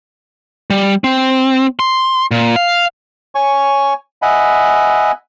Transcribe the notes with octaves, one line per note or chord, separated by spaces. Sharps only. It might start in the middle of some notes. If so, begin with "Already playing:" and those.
G3
C4
C6
A#2
F5
C#5 G#5 C#6
D#5 E5 F#5 G#5 B5